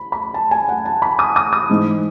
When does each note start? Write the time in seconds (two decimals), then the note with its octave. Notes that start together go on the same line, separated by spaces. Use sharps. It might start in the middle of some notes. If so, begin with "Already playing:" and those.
Already playing: B5
0.12 B5
0.34 A5
0.51 G#5
0.69 F#5
0.85 A5
1.02 B5
1.19 D#6
1.36 D#6
1.53 D#6
1.70 G#2 E3 G#3 D#4